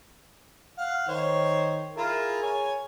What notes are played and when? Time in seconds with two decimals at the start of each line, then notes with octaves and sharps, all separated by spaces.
0.78 F5 F#5
1.08 D#3 C5 C#5
1.97 E4 F4 G#4 A#4
2.42 C#5 G#5